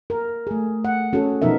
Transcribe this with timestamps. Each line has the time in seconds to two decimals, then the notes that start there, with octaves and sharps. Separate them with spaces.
0.10 A#4
0.47 A3 G#4
0.85 F#5
1.13 C#4 F#4 G#4 A4
1.42 B2 F3 B3 D#4 A#4 E5